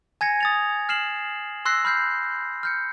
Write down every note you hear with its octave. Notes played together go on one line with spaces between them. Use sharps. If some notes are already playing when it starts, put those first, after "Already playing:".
G#5 G#6 A#6 C#7
D#6 A6 F7
F6 C7 E7 F#7
C6 E6 F#6 A#6 C7
B5 F6 G6 C7
F6 G6 C#7